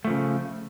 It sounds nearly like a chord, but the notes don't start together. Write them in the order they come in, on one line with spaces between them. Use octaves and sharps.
A3 F3 C#3